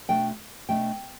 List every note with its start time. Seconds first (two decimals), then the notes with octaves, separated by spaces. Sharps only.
0.08 B2 A3 D4 G5
0.69 B2 A3 D4 G5